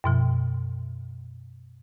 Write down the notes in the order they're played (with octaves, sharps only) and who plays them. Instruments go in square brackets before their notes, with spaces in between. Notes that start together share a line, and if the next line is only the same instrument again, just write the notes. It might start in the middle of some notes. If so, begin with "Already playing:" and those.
[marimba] F#2 B2 F3